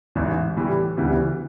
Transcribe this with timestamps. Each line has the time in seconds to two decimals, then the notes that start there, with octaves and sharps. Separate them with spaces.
0.15 A1 G#2 E3
0.57 A2 E3 G3
0.97 D2 C#3 E3 G3 B3